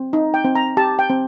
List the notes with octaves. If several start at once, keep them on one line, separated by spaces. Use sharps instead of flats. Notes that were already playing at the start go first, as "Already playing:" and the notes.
Already playing: C4
D#4
G5
C4
A#5
G4 A5
G5
C4